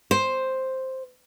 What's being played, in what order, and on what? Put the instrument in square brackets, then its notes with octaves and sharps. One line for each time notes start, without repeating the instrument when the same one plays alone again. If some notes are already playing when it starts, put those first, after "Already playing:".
[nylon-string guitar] C5